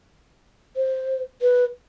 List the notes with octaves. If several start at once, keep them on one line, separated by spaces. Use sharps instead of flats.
C5
B4